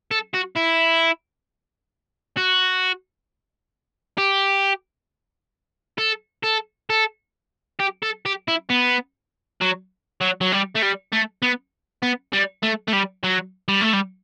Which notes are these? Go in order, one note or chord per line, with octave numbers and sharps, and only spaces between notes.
A4
F#4
E4
F#4
G4
A4
A4
A4
G4
A4
G4
E4
B3
F#3
F#3
F#3
G3
A3
G3
A3
B3
B3
G3
A3
A3
G3
F#3
G3
A3
G3